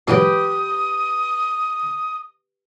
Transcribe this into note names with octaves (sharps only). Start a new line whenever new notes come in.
G#2 E3 F#3 G4 B4 G5 D#6